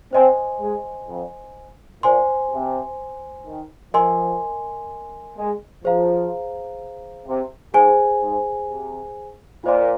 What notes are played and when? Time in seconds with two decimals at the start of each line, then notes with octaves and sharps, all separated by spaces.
0.13 C4 C5 D#5 G#5 C6
0.61 G#3
1.08 F2
2.03 A#2 C5 G#5 C6
2.51 C3
3.46 D#3
3.93 F3 A#4 D#5 G#5 C6
5.37 G#3
5.84 F3 G#4 C5 F5 A#5
7.27 C3
7.74 G#2 G#4 C5 G#5
8.22 G#2
8.69 C3
9.64 A#2 F4 C5 D#5 C6